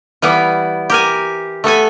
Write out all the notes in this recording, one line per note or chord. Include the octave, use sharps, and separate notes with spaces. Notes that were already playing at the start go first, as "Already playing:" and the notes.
E3 G3 B3
G4 A#4 G#5
A3 B3 A4 G#5